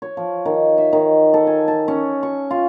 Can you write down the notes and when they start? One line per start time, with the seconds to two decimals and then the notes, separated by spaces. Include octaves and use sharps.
0.02 C#5
0.17 F3
0.45 D#3
0.78 E5
0.93 D#3
1.34 A4
1.47 G#5
1.68 A5
1.88 C#4
2.23 C#6
2.51 F4